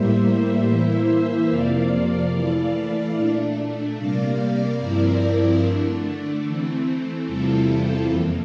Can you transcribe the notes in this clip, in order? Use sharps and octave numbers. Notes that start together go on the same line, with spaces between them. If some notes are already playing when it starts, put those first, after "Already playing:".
Already playing: A2 G3 A#3 C5 E5
E3 A#3 E4
F2 C3 F3 A#3 D5 F5
E3 A3 E4
A#2 A3 D4
C3 G3 A#3 D5 F5
G2 F3 C4 E4 A#4 D5
D3 A3 D4
E3 A3 C4
E2 C3 G3 C4 E4 F4 A4
F2 E3 A#3